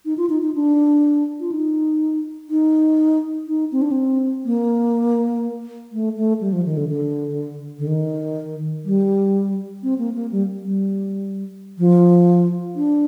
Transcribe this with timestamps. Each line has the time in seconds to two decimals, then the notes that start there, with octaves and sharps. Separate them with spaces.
0.05 D#4
0.18 F4
0.30 D#4
0.42 D#4
0.55 D4
1.40 F4
1.52 D#4
2.50 D#4
3.48 D#4
3.72 C4
3.82 D4
3.91 C4
4.45 A#3
5.92 A3
6.16 A3
6.41 G3
6.52 F3
6.65 D#3
6.77 D3
6.89 D3
7.79 D3
7.87 D#3
8.85 G3
9.83 C4
9.98 A#3
10.15 A#3
10.32 G3
10.64 G3
11.79 F3
12.76 D4